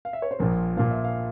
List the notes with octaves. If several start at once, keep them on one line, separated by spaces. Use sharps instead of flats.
F5
E5
C#5
C5
A#1 A#2 F3 A#4
A#1 A#2 F3 F5
E5
F5